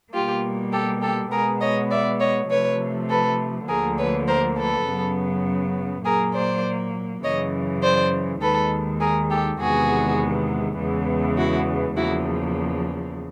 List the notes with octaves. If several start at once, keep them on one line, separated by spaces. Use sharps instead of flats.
B2 G3 A#3 F4 G4
G4 A4
G4 A4
B2 G#3 B3 G#4 A#4
C#5 D#5
D5 E5
C#5 D#5
C3 F3 A3 B4 C#5
A4 B4
D2 D3 F3 A#3 G#4 A#4
B4 C#5
A#4 C5
A4 B4
F#2 C#3 F#3 B3
A#2 F#3 A#3 G#4 A#4
C5 D5
F#2 C#3 E3 C#5 D#5
C5 D5
D#2 D#3 G#3 A4 B4
G#4 A#4
G4 A4
E2 C3 D#3 G#3 B3 F#4 G#4
E2 C#3 E3 G#3 B3
E4 F#4
E2 C#3 F3 A#3 E4 F#4